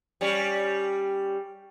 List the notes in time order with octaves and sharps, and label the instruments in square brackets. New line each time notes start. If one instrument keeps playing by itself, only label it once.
[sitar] G3 C#4